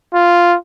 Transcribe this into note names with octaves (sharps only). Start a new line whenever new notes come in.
F4